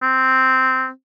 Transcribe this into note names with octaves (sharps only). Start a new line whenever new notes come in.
C4